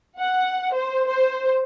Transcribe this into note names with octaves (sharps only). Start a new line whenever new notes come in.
F#5
C5
C5